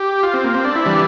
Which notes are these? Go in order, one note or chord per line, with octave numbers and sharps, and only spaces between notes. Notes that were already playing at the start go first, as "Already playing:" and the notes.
Already playing: G4
F4
C4
A#3
C4
D4
E4
E3 G3 D4